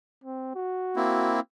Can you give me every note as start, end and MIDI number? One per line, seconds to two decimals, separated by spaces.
0.24 0.55 60
0.55 1.38 66
0.96 1.40 58
0.96 1.40 60
0.96 1.40 64